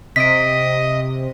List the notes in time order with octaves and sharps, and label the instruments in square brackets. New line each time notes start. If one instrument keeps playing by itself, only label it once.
[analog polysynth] C3 [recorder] D#5 [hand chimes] B6 D7